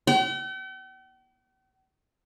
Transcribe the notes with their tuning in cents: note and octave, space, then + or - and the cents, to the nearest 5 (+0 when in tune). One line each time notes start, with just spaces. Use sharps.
G5 -45